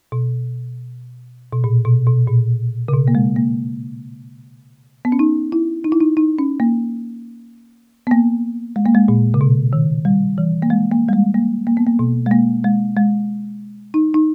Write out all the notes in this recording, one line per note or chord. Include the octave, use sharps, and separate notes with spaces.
B2
B2
A#2
B2
B2
A#2
C#3
B2
A#3
G#3
A#3
B3
C#4
D#4
E4
D#4
E4
D#4
D#4
C#4
A#3
B3
A#3
G#3
A#3
G#3
A#2
C#3
B2
D#3
G3
E3
A#3
G#3
A#3
G3
G#3
A#3
A#3
B3
A#3
B2
G#3
A#3
G#3
G#3
D#4
D#4